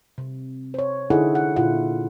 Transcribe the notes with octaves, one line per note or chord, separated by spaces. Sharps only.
C3
C5 C#5
D3 D#4 E4 G#4 A4 F#5
F#5
A#2 D3 E4 F4 F#5